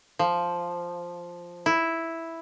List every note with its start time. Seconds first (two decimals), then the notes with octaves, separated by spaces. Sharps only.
0.19 F3
1.66 E4